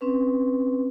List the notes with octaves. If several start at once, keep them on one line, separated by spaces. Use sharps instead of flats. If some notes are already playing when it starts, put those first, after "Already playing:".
C4 C#4 B4